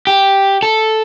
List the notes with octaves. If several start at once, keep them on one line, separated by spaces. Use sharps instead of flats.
G4
A4